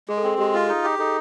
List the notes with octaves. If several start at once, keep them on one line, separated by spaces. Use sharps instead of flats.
G#3 G#4
A4
C4 G#4
G#3 G4
F4
D#4 G#4
G4
D#4 A4